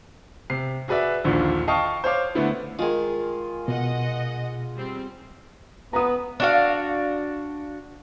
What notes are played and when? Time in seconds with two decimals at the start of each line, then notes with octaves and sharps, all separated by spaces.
0.50 C3 C7
0.88 F#4 G#4 B4 D5 E5
1.24 A#1 D#2 A#2 D3
1.67 D#5 F5 G5 A5 C#6 D#6
2.04 C5 C#5 F5 D6
2.35 D3 A3 B3 E4
2.79 D#3 G#3 F4 G#4
3.68 B2 D#5 F#5
4.76 G3 C4
5.93 B3 A#5 D#6
6.40 D4 F#4 F5